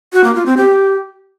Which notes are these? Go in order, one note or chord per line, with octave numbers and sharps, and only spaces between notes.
F#4
A#3
F4
C4
G4